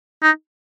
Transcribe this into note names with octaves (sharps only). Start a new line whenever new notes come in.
D#4